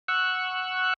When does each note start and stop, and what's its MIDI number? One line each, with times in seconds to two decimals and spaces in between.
0.08 0.94 78
0.08 0.94 85
0.08 0.94 88
0.08 0.94 90